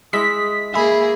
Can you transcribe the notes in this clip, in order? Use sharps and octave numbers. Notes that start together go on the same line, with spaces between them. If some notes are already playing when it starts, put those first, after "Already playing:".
G#3 E4 D#6 B6
A#3 G#4 E5 G#5 B5